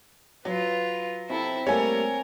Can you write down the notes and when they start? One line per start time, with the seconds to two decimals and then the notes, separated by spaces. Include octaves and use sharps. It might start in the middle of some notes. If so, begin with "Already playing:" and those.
0.45 F#3 F4 B4
1.30 C3 E4 A4
1.67 G3 A3 A#3 A#4 C#5 G#5